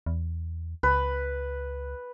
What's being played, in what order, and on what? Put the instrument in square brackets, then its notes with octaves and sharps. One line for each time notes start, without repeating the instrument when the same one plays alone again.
[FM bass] E2
[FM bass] C#2 [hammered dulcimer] B4